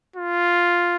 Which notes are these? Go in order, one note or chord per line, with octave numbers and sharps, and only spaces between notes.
F4